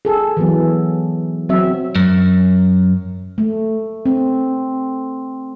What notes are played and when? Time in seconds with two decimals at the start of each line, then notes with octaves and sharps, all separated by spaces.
0.05 G#4 A4
0.37 E3 F#3 B3
1.49 F#3 C4 E5
1.96 F#2
3.38 A3
4.05 C4